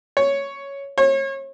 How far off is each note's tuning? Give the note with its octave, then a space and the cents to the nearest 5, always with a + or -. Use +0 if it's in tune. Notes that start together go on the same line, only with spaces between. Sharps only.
C#5 +5
C#5 -35